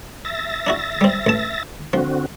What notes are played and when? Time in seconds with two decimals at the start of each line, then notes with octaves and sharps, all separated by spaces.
0.25 E5 A6 A#6
0.67 D4 E4 F#4
1.01 G3 C4
1.26 A1 A5
1.93 D3 F3 C4 F#4